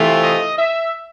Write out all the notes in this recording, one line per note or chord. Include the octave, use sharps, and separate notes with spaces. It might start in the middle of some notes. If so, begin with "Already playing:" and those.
Already playing: C3 E3 A3 C4 F4
D#5
E5